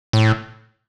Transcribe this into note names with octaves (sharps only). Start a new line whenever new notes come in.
A2